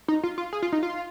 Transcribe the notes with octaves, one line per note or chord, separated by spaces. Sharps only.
D#4
F4
F4
G#4
F4
D#4
F4